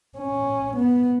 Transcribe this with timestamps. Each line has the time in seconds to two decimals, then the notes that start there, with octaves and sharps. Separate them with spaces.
0.18 C#4
0.77 B3